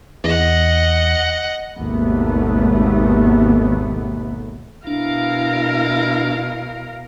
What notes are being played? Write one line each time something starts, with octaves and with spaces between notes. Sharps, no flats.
E2 D#5 F#5
G#1 D#2 B2 D#3 A3 B3
B2 D4 E4 A#4 F5